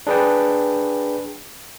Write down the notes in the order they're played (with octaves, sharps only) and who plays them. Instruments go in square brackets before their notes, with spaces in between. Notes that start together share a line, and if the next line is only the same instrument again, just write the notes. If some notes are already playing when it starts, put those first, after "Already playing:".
[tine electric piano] D4 G#4 B4 D5 G5